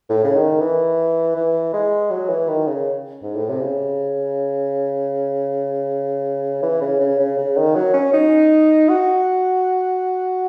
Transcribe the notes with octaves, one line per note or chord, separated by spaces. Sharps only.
A2
C#3
D#3
E3
E3
G#3
F#3
E3
D#3
C#3
G#2
A2
C3
C#3
E3
C#3
C#3
C#3
C#3
D#3
F#3
C#4
D#4
F#4